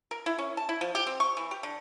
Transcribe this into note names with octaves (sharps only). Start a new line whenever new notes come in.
A#4
E4
C#4
A5
E4
F3
G4
C4
C#6
E3
G4
D3